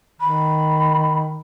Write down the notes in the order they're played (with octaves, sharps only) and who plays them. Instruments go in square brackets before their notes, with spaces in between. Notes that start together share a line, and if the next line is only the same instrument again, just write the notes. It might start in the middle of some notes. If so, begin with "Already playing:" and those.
[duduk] D#3 [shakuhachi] B5